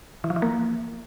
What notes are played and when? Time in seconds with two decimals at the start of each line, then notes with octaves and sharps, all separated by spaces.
0.24 E3
0.30 F3
0.36 E3
0.42 A#3